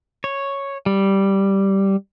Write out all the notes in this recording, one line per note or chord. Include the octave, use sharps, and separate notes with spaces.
C#5
G3